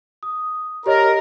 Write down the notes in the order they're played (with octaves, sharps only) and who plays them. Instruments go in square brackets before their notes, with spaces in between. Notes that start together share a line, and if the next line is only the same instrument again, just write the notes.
[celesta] D#6
[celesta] G4 C#5 D#5 [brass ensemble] A#4